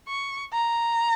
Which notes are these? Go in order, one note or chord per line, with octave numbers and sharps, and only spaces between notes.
C#6
A#5